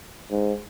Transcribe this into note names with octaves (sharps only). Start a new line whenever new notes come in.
G#2